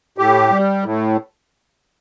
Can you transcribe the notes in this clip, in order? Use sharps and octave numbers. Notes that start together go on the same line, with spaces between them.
A2 G4
G3
A2